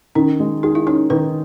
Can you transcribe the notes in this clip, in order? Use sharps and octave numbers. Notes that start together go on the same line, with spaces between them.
D#3 C#4
G#3
D#4 G#4
E4
C#4 D#4
D#3 B4